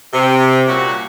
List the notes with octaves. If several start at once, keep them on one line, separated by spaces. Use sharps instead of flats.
C3
A#2 G3 C#4 F#4